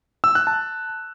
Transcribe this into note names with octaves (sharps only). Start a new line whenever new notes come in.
E6
F#6
A5